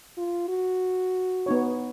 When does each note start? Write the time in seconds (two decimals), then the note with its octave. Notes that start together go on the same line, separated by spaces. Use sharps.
0.18 F4
0.49 F#4
1.46 B3 D#4 C#5